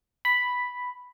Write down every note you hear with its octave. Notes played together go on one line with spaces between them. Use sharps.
B5